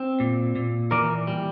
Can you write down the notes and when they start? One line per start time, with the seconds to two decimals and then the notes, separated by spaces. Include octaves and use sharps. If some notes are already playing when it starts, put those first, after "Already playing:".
Already playing: C4
0.20 A#2
0.56 A#2
0.91 E3 A#4 D5
1.27 G3